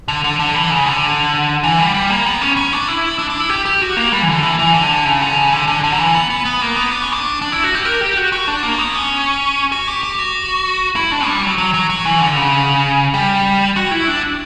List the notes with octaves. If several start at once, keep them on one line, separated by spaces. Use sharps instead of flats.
D3
D3
D3
E3
C#3
D3
E3
G3
G3
A#3
B3
C#4
C#4
D4
E4
D4
D4
E4
G4
G4
F#4
A#3
G3
E3
D3
E3
E3
D3
C#3
D3
C#3
D3
D3
D3
F#3
E3
B3
B3
B3
A#3
B3
D4
C#4
D4
D4
E4
F#4
G4
A#4
G4
F#4
F#4
D4
A#3
B3
C#4
F#4
G4
G4
F#4
E4
D4
G3
F#3
F#3
F#3
F#3
E3
D3
C#3
G3
F#4
E4
D4